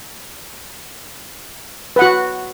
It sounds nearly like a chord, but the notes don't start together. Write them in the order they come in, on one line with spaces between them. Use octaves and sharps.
B4 F#5 F#4